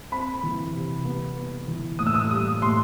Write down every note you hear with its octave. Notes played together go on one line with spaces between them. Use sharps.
C4 B5
E3
C3
B3
B3
E3
A2 D#6
E6
D#6
G3 D#6
A2 C6